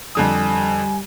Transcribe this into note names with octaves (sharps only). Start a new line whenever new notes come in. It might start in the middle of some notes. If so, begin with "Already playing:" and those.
F2 D3 G3 G#5 D#6